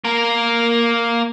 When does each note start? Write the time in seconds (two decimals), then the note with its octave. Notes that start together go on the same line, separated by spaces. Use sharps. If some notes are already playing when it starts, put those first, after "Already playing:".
0.05 A#3 A#4